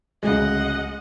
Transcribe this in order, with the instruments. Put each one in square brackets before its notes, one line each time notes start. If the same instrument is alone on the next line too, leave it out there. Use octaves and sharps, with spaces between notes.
[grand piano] D1 C#2 [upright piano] G#3 [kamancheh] D#5 F#5